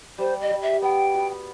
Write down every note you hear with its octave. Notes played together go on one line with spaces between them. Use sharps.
G3 C5
D#5
G3
E5
B3 G5
F#4